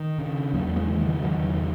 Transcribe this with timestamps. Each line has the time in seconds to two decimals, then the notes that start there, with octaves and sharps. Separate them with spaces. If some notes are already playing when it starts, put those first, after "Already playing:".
Already playing: D#3
0.18 C#3
0.53 E2 F#3 A#3
0.76 E3 G#3
0.88 C#3
1.00 D#3 F#3
1.22 E2 D#3 F#3
1.58 C#3